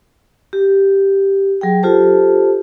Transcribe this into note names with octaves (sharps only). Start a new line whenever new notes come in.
G4
F#3 G#4 G5
F4 G4 A4 C5 A5